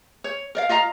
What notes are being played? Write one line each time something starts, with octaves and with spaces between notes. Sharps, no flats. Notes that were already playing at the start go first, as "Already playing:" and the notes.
C#5
A#4 D5 F5
F4 D#5 F5 A#5